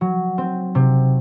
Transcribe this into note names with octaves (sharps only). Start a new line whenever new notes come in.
F#3
C4
C3